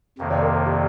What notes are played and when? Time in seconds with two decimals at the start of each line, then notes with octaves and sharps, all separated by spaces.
0.18 F2 C3 D#3 A#3
0.30 D5
0.42 A#4
0.54 C5
0.66 G4